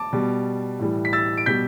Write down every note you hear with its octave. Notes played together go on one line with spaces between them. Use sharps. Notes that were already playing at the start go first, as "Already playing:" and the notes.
Already playing: A5 D6
B2 G3
A2 E3 G3
B6
E6 A6
D7
B2 G3 G6 B6